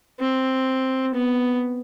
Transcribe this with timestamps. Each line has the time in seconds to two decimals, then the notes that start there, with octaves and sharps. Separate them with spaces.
0.20 C4
1.14 B3